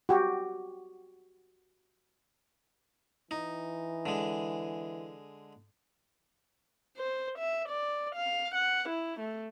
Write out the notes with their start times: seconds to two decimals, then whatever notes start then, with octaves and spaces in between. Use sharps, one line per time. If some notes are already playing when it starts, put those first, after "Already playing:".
0.09 F#4 G4
3.31 E3 D#4
4.06 D3 G#3
6.97 C5
7.39 E5
7.69 D5
8.15 F5
8.55 F#5
8.89 E4
9.20 A3